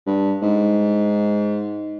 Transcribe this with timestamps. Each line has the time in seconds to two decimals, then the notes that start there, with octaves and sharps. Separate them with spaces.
0.06 G2
0.42 G#2